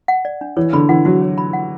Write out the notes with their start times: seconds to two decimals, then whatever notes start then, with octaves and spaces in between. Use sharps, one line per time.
0.08 F#5
0.25 D5
0.41 D4
0.57 E3 C#5
0.73 D3 B5
0.89 E3 F#5
1.05 F#3 F#4
1.21 C#5
1.38 B5
1.53 F#5